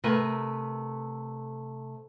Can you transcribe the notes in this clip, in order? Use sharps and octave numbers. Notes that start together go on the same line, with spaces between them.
C3 A3 A#4 B4 G#5